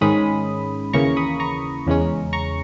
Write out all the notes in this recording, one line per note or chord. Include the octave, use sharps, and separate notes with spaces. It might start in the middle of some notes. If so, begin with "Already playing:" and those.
G#2 D#3 G#3 C#4 B5 D#6
D#2 C#3 E3 A#3 A#5 C#6
B5 D#6
A#5 C#6
E2 C#3 G#3 C#4
A#5 C#6